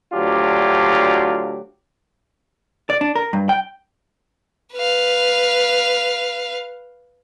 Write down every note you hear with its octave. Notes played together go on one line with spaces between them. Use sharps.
D2 F#3 D4 F4 G4
D5
D4
A#4
G2
G5
B4 F5